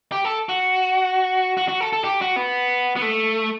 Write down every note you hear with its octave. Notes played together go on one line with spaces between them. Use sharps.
G4
A4
F#4
F#4
F#4
A4
A4
G4
F#4
B3
B3
A3